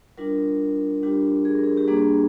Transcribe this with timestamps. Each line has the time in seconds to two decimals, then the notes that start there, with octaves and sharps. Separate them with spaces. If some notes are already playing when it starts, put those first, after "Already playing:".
0.18 G3 D4 F4 A#4
1.03 G3 D4 F4 G4
1.45 G#4
1.54 A#4
1.64 G#4
1.77 G4
1.87 G3 A#3 D4 G#4